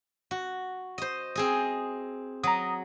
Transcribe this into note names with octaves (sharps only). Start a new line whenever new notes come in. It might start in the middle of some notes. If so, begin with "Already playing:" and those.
F#4
C5 D#5
C4 G#4 D#5
F#3 A#5 D#6